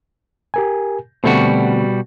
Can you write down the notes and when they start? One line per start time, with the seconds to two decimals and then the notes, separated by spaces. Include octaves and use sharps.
0.54 G4 A#4 G#5
1.24 B2 D3 G3 A3 C4 F#4